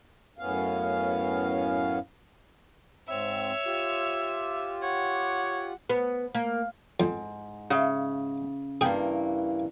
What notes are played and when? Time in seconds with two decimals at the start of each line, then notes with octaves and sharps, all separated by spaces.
0.39 F#2 A2 B3 C#4 F5
3.09 G#2 C4 C#5 E5 E6
3.66 F4 G4
4.83 C#5 F#5
5.90 B3
6.35 A#3
7.00 F2 G#2
7.70 C#3 E5 F5
8.81 G2 E3 A#3 G#4 G5